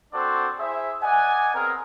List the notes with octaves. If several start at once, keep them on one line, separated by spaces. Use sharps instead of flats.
C4 D4 F#4 A4 C5 D5
E4 G#4 C5 E5
D5 D#5 F#5 G#5
B3 C4 G#4 A#4